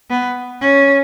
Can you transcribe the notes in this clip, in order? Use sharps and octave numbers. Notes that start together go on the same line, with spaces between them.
B3
C#4